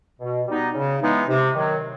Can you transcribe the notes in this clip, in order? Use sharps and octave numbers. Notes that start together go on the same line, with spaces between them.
B2
G3 B3 D#4
C#3
E3 G#3 B3 D#4
C3
D#3 F#3